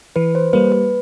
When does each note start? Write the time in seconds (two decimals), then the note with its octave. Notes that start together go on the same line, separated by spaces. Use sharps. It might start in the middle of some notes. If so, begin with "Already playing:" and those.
0.16 E3 B4
0.35 C5
0.53 G3 A#3 B4
0.72 B4